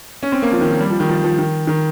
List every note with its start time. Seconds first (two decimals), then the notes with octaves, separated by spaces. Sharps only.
0.23 C#4
0.32 C4
0.42 A#3
0.52 F3
0.61 D#3
0.71 F3
0.81 G3
0.90 F3
1.00 D#3
1.09 F3
1.24 F3
1.39 D#3
1.67 D#3